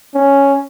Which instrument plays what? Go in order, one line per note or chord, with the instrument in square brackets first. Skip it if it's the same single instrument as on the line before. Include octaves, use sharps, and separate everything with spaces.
[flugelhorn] C#4